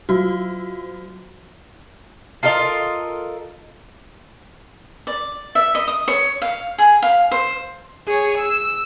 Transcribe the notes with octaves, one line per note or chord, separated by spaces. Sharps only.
F#3 F4 F#4
F4 A4 A#4 D#5
D5
E5
D#5
D#6
C#5
F5
G#4
F5
C5
G#4 C#5
E6